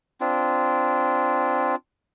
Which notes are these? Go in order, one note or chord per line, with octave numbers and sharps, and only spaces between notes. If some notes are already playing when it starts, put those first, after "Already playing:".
C4 D4 F4